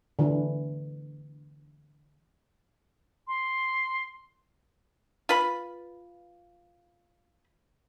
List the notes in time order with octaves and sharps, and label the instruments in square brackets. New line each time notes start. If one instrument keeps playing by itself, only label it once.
[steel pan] D3 E3
[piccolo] C6
[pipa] F4 B4 B5